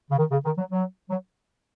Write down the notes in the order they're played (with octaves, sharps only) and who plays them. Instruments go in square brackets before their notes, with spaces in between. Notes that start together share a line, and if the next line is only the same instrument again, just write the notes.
[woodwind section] C#3
D#3
C#3
D#3
F#3
F#3
F#3